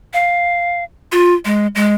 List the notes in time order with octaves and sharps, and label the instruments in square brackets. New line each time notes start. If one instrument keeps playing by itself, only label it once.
[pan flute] F5
F4
G#3
G#3